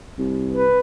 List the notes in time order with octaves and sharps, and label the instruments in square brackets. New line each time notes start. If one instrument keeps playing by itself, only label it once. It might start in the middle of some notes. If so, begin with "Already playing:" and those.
[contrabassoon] C2
[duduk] B4